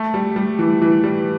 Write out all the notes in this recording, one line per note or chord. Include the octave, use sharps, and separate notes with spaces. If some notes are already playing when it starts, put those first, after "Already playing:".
Already playing: A3
G3
G3
E3
E3
G3